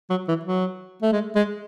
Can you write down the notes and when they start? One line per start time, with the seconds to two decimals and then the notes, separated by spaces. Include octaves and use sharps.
0.10 F#3
0.28 E3
0.45 F#3
1.02 A3
1.12 G#3
1.36 G#3